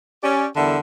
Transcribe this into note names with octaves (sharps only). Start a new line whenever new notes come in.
C#4 G4 D5
E2 D3 G3 A4 A#4 E5